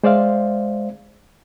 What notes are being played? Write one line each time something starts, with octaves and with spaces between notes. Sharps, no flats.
G#3 C5 D5 E5 F5